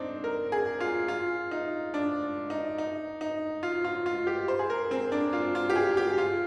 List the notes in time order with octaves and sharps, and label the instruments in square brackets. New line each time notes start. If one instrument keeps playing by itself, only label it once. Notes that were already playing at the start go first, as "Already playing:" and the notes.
Already playing: [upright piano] C4 D4 D#4
A#4
G#4
F4
F4
D#4
D4
D#4
D#4
D#4
F4
F4
F4
G4
C5
G#4
A#4
C4
D4
F4
F4
G4
G#4
G4
F4